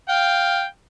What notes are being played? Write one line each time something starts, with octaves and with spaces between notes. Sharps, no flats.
F5 G5